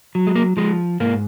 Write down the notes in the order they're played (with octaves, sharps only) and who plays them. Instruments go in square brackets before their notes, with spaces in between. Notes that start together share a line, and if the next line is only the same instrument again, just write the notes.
[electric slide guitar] F#3
G#3
A#3
F3 G#3
G#2 A#3